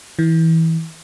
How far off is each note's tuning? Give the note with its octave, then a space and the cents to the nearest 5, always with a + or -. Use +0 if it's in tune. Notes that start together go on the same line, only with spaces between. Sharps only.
E3 -20